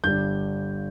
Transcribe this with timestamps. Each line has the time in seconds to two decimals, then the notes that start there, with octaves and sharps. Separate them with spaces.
0.04 G1 G2 G3 G6